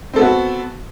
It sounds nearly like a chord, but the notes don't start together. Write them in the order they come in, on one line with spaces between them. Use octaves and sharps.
C4 A4 B3 F#4